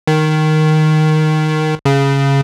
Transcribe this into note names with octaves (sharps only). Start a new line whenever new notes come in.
D#3
C#3